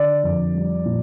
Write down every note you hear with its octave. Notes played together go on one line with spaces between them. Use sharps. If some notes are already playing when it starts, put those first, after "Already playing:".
Already playing: D3 D5
F2
G3
A#2